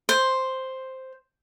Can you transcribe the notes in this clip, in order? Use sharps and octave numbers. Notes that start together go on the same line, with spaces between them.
C5